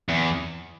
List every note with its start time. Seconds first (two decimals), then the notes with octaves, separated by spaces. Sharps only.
0.09 E2